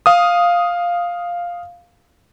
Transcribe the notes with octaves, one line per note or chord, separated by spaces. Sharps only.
F5 D#6